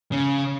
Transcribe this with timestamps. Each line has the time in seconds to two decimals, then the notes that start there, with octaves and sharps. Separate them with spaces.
0.12 C#3